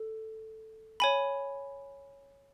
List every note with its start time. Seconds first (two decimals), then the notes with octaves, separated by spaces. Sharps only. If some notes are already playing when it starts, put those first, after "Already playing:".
Already playing: A4
1.00 C#5 G#5 B5